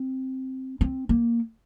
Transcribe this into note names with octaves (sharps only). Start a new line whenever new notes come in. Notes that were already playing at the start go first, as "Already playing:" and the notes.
Already playing: C4
C4
A#3